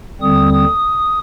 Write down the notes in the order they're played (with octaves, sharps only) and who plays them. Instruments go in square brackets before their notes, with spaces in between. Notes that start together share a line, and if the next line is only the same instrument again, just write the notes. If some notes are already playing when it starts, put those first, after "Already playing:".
[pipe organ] D#2 D3 G3 C4 D#6
D#6